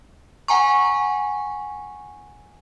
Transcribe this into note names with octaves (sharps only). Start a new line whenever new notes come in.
F#5 G#5 A#5 C#6